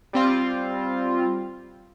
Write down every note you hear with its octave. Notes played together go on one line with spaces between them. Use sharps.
G3 C4 F4